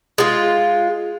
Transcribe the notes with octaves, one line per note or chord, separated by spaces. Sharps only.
G#3 F4